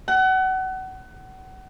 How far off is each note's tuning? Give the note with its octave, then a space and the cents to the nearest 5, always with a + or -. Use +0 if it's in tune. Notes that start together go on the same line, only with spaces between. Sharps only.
F#5 +30